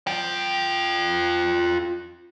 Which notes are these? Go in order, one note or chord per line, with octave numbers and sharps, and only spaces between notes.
F4 G5